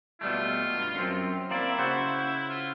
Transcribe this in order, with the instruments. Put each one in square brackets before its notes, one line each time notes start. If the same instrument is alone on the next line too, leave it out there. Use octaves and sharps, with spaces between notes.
[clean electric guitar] B2 G3 A3 [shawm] F4
[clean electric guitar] G2
F#2 C4
[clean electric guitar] A#3 C4 D5 [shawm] E4
[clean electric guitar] C#3 F#4 C5
[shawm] F4